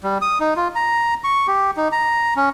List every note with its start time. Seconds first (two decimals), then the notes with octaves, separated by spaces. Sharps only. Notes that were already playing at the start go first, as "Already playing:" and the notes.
0.03 G3
0.22 D#6
0.40 D#4
0.56 F4
0.75 A#5
1.24 C#6
1.47 G4
1.77 D#4
1.92 A#5
2.36 C#4